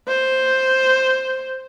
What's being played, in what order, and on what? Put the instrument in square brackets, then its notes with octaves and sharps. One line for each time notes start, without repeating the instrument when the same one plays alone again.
[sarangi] C5